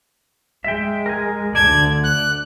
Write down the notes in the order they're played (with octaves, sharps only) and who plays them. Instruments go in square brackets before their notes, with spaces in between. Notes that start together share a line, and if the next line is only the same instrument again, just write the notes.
[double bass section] G#3 [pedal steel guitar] E5 G5
[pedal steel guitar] A#4 G#5
[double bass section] D2 D3 [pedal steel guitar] D5 A5 [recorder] G#6
[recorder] F#6